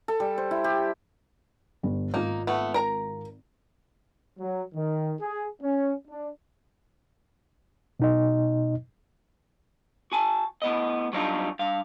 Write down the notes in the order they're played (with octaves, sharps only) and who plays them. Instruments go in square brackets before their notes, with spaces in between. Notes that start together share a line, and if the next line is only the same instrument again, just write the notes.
[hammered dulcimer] A4
G3
C5
E4
G4
[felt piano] G1
[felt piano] G#1 F4 [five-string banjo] A#3 D#4
[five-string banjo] A3 B3
A#4 A#5
[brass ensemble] F#3
D#3
G#4
C#4
D4
[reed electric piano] B2 D#4 D#5
[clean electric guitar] F#4 G#5 A5
A2 B3 D#5
F#3 G3 D4 D#4 F4
G2 F5